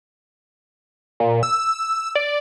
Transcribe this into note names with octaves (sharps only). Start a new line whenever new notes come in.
A#2
E6
D5